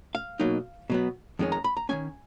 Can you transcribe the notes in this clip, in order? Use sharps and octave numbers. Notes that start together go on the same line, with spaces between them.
F5
B2 F#3 A#3 D#4
B2 F#3 B3
F2 D#3 G#3 C#4
A#5
B5
A#5
D#3 G#3 C#4 G#5